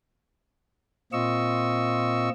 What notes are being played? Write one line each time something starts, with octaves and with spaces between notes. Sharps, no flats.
A#2 C4 F4 D#5 C#6 E6